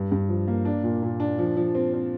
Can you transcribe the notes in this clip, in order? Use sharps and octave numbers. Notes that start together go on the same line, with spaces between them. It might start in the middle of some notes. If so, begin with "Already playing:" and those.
Already playing: G2
G2
F3
A#3
D4
A#2
A#2
D4
F3
F3
C4
C4